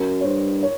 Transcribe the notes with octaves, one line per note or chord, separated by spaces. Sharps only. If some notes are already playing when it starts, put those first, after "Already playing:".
Already playing: F#2 A#4
C#5
G2 C5
C#5